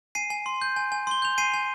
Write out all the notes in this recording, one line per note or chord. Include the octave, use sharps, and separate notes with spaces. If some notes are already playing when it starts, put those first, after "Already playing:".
G#5 C7 D#7
G#5
C6
G6
G#5
G#5
C6 G7
G6 F7
G#5 C7 D#7
G#5